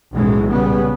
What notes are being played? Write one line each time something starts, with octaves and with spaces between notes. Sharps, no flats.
B1 F#2 A2 E3 G#3
A#2 C#3 G3 B3